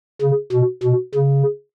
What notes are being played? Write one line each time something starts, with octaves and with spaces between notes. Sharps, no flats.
C#3
B2
B2
C#3